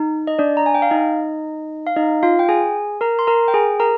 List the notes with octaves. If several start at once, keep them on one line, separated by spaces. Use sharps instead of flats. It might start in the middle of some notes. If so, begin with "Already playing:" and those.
Already playing: D#4
D#5
D4 D5
A#5
G#5
G5
F5
D#4 D#5
F5
D#4 D#5
F4 F5
G5
G#4 G#5
A#4 A#5
C6
A#4 A#5
G5
G#4 G#5
A#4 A#5